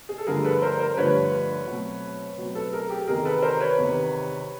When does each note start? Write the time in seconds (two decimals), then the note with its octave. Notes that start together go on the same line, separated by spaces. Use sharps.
0.09 G#4
0.18 A4
0.27 G2 D3 F3 A3 G#4 A#4
0.44 A4 B4
0.62 A#4 C5
0.79 A#4 C5
0.97 G2 D3 F3 A3 B4 C#5
1.67 B2 F#3 A3 C4
2.38 B2 F#3 A3 C4
2.55 A4 B4
2.73 G#4 A#4
2.90 G4 A4
3.07 E2 C3 D#3 G#4 A#4
3.25 A4 B4
3.43 A#4 C5
3.60 B4 C#5
3.78 E2 C3 D#3